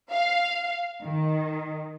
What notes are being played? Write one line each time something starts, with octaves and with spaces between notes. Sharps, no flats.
F5
D#3